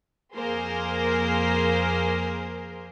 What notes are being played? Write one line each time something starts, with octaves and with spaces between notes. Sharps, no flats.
F2 A#3 G#4 A#4 C5